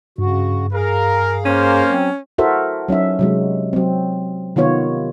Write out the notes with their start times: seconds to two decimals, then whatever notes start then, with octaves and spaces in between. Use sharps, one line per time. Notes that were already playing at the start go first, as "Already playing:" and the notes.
0.18 G2 C#3 F#4
0.74 G#4 A#4 F5
1.46 A#3 C#4 C5
1.88 F#3 C4
2.38 E4 F#4 A4 A#4 C5 E5
2.88 F#3 C#4 D#4 E5
3.19 C3 F#3 G#3
3.73 F#3 C4
4.56 C3 D#3 B3 F4 C#5